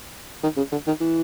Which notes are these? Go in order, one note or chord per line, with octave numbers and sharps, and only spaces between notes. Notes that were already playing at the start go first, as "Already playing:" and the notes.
D#3
C#3
D3
D#3
E3